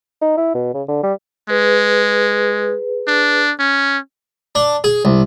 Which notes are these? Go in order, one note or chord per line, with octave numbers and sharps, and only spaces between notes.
D#4
E4
B2
C#3
D3
G3
G#3 G#4 B4
D4
C#4
D4
G#4
C2